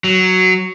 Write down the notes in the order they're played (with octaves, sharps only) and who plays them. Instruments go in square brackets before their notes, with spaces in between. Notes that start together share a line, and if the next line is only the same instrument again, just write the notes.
[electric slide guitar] F#3